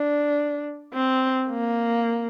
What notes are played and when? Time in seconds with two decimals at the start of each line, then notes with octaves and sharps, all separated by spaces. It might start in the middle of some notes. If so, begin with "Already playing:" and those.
Already playing: D4
0.94 C4
1.50 A#3